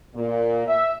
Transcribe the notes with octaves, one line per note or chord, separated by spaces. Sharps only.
A#2
E5